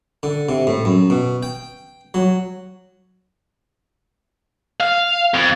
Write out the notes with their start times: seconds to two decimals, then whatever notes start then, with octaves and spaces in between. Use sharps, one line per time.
0.23 D3
0.49 C3
0.67 A2
0.85 F#2
1.10 B2
1.43 G5
2.14 F#3
4.80 F5
5.34 F2